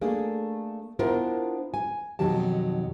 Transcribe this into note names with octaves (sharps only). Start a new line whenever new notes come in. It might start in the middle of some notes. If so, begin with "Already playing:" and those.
A3 A#3 D4 G#4
B3 D4 E4 F4 A#4 C5
G#5
F2 B2 D#3 F#3 G4 A5